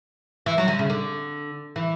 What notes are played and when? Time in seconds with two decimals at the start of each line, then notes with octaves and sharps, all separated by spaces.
0.46 E3
0.58 F#3
0.68 D3
0.79 C#3
0.90 D3
1.76 E3